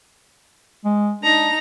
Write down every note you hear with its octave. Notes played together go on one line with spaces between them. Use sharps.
G#3
D4 D#4 A#5